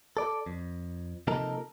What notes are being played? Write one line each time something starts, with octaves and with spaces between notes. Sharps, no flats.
A4 D5
F2
C3 F3 A#3 D#4 A4 A#4